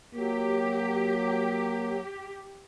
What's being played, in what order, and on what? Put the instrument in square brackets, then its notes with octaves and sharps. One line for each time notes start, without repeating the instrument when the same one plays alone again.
[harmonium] F#3 [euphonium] A#3 [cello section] G4